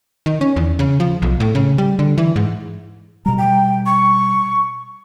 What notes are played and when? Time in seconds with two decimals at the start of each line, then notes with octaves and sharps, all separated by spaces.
0.26 D#3
0.41 C#4
0.56 E2
0.79 C#3
1.00 F3
1.22 B1
1.40 A2
1.55 C#3
1.78 G3
1.99 D3
2.18 E3
2.36 G#2
3.26 B2 G3 A#5
3.38 G5
3.86 C#6